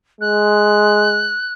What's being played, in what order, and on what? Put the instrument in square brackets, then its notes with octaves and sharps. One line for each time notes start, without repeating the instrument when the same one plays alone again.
[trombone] G#3 [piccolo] F#6